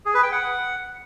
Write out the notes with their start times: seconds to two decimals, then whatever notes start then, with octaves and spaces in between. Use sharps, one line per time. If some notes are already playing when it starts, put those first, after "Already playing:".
0.06 G#4
0.14 B4
0.23 G5
0.32 F#5